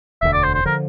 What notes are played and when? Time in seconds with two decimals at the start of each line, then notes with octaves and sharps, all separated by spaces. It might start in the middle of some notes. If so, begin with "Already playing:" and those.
0.22 E1 D2 D3 E5
0.33 D5
0.43 C5
0.54 C5
0.65 D3 F3 A#4